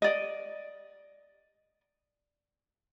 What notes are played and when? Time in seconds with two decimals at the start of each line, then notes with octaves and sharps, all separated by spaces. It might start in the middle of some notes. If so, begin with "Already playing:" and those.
0.02 D5 D#5